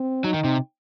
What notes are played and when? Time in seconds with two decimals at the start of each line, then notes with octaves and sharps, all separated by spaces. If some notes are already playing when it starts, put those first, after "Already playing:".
Already playing: C4
0.24 F#3 D#4
0.34 D#3
0.44 C3